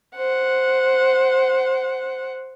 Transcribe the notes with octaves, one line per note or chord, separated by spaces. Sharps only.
C5 F#5